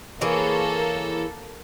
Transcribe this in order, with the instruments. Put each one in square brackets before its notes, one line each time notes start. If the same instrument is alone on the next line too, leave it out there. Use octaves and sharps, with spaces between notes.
[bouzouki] E3 G#4 C#5 [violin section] A#3 A4